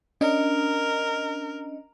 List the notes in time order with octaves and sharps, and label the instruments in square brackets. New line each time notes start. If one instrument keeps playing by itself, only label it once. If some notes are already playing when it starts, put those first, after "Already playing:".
[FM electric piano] C#4 D4 D#5 [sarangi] A#4